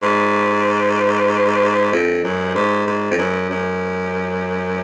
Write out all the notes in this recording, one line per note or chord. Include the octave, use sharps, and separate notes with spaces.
G#2
F2
F#2
G#2
G#2
F2
F#2
F#2